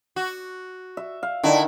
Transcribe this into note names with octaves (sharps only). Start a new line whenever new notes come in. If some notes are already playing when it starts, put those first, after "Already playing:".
F#4
E5
F5
D3 D#3 D4 E4 G5